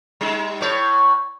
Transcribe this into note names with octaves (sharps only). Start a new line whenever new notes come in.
G3 D#4
A2 C#5